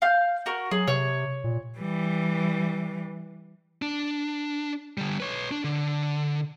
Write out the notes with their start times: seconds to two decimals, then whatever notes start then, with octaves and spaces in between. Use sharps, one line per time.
0.02 F5 G6
0.46 F#4 A#4
0.71 F#3 G#4
0.88 C3 C#5
1.44 A#2
1.78 E3 G3
3.82 D4
4.98 D3 G3
5.20 B4 C#5
5.51 D4
5.64 D3